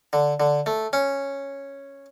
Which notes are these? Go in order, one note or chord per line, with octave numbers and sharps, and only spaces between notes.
D3
D3
A3
C#4